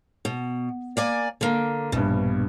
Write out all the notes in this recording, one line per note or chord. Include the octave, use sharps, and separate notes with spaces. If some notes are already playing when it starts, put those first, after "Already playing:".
B2
A#3 D5 G#5
D3 A#3
A#1 G2 B2